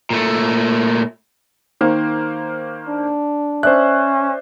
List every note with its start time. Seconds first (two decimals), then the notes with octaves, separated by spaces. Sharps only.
0.10 A#2 A3
1.81 D#3 A#3 C5
2.88 D4
3.63 C#4 C5 D5 E5 F#6